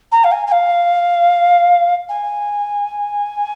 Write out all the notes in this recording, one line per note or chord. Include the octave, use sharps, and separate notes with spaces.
A#5
F5
G#5
G#5
F5
G#5